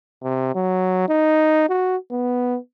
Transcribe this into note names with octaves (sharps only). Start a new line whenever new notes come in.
C3
F#3
D#4
F#4
B3